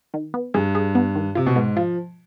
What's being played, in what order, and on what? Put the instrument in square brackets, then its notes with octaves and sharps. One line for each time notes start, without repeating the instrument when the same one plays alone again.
[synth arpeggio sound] D#3
B3
[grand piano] G2 [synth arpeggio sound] G#4
[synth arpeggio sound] G#4
B3
D#3
[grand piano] C3 [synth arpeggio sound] F4
[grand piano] B2
[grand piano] G#2 [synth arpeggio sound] B3
[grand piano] F3 [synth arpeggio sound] F4